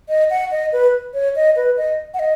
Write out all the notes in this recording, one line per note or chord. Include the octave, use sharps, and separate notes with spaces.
D#5
F#5
D#5
B4
C#5
D#5
B4
D#5
F#5
D#5